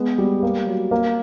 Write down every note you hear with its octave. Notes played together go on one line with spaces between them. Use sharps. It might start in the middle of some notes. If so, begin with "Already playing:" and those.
Already playing: G#3 B3
G3
A#3
F#3
A#3